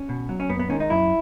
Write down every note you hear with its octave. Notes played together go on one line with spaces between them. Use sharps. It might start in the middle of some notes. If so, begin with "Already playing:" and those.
Already playing: C#4
B2
F#3
C#4
F#2 B3
B3
D#3 G#3 C#4
D#4
F#2 E4